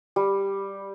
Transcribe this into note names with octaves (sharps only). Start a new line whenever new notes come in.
G3